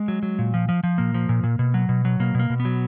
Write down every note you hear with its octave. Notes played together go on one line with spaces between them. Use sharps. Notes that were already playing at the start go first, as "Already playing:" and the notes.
Already playing: G#3
F#3
F#3
A#2
F3
F3
F3
A#2 A#3
F3
A#2
A#2
B2
F#3
B2
F#3
B2 A#3
B2 A#3
B2
B3
F#3